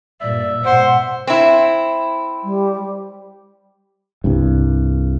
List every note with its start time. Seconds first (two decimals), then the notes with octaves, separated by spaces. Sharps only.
0.21 G2 A#2 D5 E5
0.64 G#2 B2 C5 F#5
1.27 C4 E4
2.44 G3
4.24 C2 G2